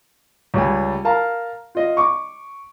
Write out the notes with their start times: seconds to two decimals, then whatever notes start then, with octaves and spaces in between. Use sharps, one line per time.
0.54 C#2 G3 G#5
1.05 A#4 F5 A5 A#5
1.75 F4 D#5
1.97 C#6 D6